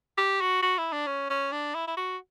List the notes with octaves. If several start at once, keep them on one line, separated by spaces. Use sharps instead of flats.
G4
F#4
F#4
E4
D4
C#4
C#4
D4
E4
E4
F#4